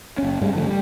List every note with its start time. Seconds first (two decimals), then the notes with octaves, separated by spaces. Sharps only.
0.18 F#1 C#4
0.41 G2 G3 G#3 C#4
0.54 D3 F3 A3
0.67 G3